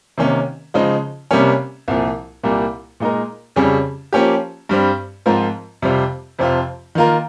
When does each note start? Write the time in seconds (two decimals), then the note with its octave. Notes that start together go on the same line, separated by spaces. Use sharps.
0.18 C3 D#3 A#3 C#4
0.74 C#3 F3 G#3 D#4
1.31 C3 G3 A#3 C#4
1.88 C2 A#2 F3
2.43 C2 A#2 G3 A#3
3.00 A#2 G#3 D#4 A#4
3.56 F2 C#3 G3 C#4 G#4
4.13 F3 A#3 C#4 G4
4.69 G2 G3 C4
5.26 G#2 F3 C4 F4 A#4
5.82 F2 C3 G3 C4 F4
6.39 F2 C3 F3 C4 F4
6.95 D#3 A#3 F4 A#4